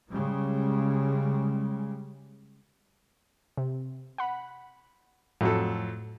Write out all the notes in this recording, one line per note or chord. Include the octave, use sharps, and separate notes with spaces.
C#3 G3 G#3
C3
F#5 B5
F2 A2 F#3 A4